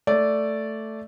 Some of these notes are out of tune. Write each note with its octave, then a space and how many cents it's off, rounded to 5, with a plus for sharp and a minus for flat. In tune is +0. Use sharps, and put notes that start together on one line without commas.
A3 +5 D5 -10